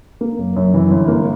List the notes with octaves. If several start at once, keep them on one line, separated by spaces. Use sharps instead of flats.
A#3
F#2
F#2
E3
G1
A#3